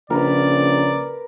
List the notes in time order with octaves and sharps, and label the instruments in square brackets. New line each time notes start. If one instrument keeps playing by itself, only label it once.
[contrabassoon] A#1 [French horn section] C#3 [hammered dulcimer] A#4 B4 [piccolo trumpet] D5